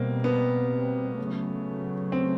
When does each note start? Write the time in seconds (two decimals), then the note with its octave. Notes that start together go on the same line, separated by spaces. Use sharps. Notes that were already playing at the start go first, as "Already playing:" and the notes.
Already playing: B2 G3 A#3 C4
0.24 B3
1.18 C#3 F#3 A3
2.12 C4